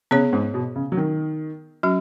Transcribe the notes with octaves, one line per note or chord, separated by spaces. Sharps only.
C#3 B3 G#4 C#5
G#2
B2
C#3
F#3
D#3
F#3 C#4 F#4